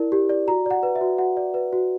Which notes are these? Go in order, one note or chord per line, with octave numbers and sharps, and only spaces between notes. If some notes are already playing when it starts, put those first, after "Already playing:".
Already playing: E4 A#4 D5
G4
D5
F#4 A#5
D5 F#5
B4
E5
F#4
F#4 F#5
D5
B4
F#4